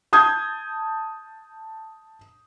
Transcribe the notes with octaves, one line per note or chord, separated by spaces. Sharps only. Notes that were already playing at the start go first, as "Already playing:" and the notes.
A5 D#6 G6 G#6